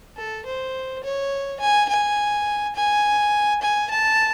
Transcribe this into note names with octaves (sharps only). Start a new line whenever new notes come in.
A4
C5
C#5
G#5
G#5
G#5
G#5
A5